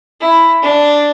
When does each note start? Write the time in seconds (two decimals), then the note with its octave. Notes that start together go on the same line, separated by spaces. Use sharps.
0.21 E4
0.63 D4